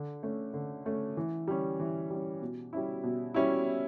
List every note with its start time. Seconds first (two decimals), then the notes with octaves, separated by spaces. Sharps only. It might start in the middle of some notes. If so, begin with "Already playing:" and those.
Already playing: D3
0.23 A3 C#4
0.54 D3
0.86 A3 C#4
1.17 E3
1.48 G3 C#4
1.80 E3
2.10 G3
2.15 C#4
2.42 B2
2.73 G3 C#4 E4
3.03 B2
3.34 G3 C#4 E4